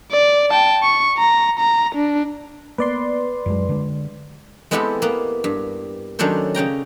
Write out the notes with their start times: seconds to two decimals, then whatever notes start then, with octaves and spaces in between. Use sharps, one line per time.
0.11 D5
0.51 G5 A5
0.83 C#6
1.18 A#5
1.59 A#5
1.95 D4
2.78 A#3 B3 B4 D5 C6
3.46 F#2 F#3 G#3
3.69 D3 G#3
4.71 G#3 B3 C4 E4 G4 A4
5.02 A#3 B3
5.44 G2
6.19 D#3 F#3 C#4 D4 A4 C5
6.55 C#3 C#4 G5 A#5